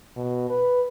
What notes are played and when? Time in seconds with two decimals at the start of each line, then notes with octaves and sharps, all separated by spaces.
0.17 B2
0.50 B4